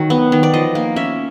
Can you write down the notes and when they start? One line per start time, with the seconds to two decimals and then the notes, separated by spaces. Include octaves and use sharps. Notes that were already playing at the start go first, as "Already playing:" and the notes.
Already playing: D#3 F#3
0.10 B3
0.32 D#3
0.43 D5
0.54 F3 D#5
0.75 A#3
0.96 C#4 E5